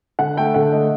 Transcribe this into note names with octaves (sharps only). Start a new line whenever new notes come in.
D3 F#5
A3 G5
D3 F#5
A3 D#5